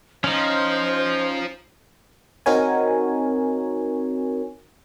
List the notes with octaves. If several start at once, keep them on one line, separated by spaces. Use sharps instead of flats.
F3 C#4 D#4 C5
C4 D#4 F#4 A#4 C#5 G#5